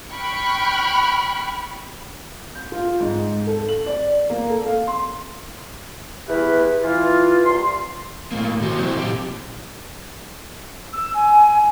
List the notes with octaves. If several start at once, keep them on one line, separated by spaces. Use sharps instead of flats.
G5 B5 C#6 F6 F#6
G6
F4
G#2
A4
F#7
D5
A#3
A4
F5
C6
E2 E4 G4 B4
E3 F4
C2 C6
A2 A#3
B2 D#3 F#4 B4 C5
C3 F#3 C4 E4 A#4 C5
A#2 G4
E6
G#5